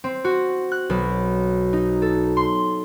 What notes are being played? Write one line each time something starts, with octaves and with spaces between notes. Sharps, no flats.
C4
F#4
F#6
B1
D#4
A4
C6